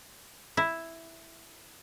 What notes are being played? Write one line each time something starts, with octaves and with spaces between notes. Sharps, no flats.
E4